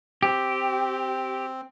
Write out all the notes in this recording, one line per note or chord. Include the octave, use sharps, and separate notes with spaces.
C4 G4